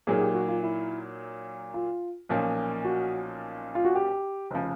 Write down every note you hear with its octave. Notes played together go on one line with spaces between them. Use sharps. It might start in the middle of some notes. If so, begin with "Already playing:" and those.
A#2 F#3 A#3 D#4 G#4
G#4
G4
F#4
F4
E4
F4
B1 A#2 F3 A#3 C#4
F#4
F4
F#4
G4
F1 C#3 F3